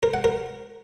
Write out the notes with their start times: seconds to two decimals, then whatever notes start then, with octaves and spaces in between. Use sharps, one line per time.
0.03 A#4
0.14 F#5
0.24 A#4